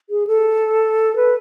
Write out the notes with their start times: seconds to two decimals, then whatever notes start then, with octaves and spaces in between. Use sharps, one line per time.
0.10 G#4
0.27 A4
1.16 B4